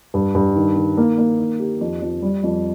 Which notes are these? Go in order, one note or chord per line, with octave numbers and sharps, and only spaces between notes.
G2
G2
D#3
D#3
A#3
A#3
D#3
G4
F2
F2
G3
F2